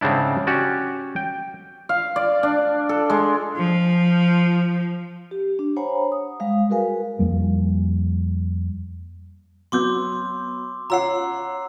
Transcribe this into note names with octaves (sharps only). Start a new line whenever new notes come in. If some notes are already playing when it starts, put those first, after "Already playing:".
G#2 C#3 C4 D4 E4
C#4 F#4 G4 D5
G5
F5
D5
D4
A4
G#3
F3
G4
D4
C5 C#5 F#5 G#5 A#5 B5
D#6
G3 G#3 F5
F#4 G#4 A#4 B4 F5 G#5
F2 G3 A#3
F#3 B3 C6 D6 E6 G6
F4 C#5 F#5 A#5 E6 C7